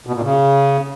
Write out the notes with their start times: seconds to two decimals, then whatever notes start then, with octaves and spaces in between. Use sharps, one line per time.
0.07 B2
0.15 A#2
0.23 C#3